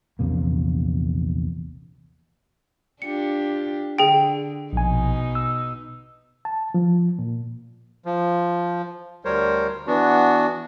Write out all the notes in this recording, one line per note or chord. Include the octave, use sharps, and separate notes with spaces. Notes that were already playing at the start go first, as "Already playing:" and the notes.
A#1 E2 C3 A#3
D4 F4 G4 C#7
D3 G#4 G5
A#1 B2 D#4 G#5
E6
A5
F3
A#2
F3
D2 G3 A#4 C5 C#5
E3 B3 D4 F#4